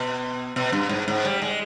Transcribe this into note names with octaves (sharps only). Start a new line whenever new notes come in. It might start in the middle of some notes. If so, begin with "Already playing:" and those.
Already playing: B2
B2
G2
G#2
G#2
G3
G#3